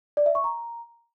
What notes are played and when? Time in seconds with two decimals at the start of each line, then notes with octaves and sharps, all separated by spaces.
0.17 D5
0.26 E5
0.35 C#6
0.44 A#5